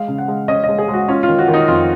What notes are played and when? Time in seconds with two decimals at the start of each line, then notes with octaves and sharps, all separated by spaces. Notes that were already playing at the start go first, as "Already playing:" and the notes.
Already playing: G#3 F5
0.08 C#3
0.18 F#5
0.28 G#3
0.48 C#4 D#5
0.64 D#5
0.69 G#3
0.78 G#4
0.88 G#3
0.93 F#4
1.08 C#4 F4
1.23 F4
1.28 D#3
1.39 F#4
1.48 D#3
1.54 D#4
1.68 F2 F4